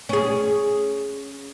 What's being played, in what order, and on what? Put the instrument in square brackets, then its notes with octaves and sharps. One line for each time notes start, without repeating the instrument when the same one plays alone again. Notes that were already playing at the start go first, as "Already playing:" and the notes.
[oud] C#4 G#4